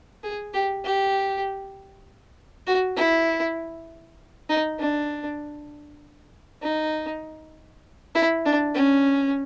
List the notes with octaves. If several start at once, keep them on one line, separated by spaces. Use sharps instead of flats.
G#4
G4
G4
F#4
E4
D#4
D4
D#4
E4
D4
C#4